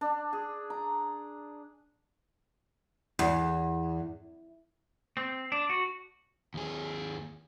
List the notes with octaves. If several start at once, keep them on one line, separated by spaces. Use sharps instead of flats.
D4
G#4
A#5
E2
C4
D4
F#4
D#2 G#4